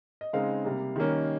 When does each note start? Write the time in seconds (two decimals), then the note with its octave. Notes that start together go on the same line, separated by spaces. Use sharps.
0.21 D#5
0.33 C#3 G#3 C4 D#4 F5
0.64 C3 G3 A#3
0.96 D#3 G3 A#3 C#4